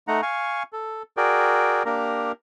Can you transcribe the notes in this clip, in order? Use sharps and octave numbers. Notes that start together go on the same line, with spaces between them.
A3 D#4 F#5 A#5
F5 G#5 C#6
A4
F#4 G#4 A#4 D5 G5
A#3 D4 G4 A#4 A#5